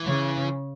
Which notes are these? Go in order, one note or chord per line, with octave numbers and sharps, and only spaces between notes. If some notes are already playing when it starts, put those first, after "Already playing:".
Already playing: E3
C#3